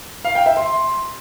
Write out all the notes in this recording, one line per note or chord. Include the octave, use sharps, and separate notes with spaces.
F5
G5
E5
C6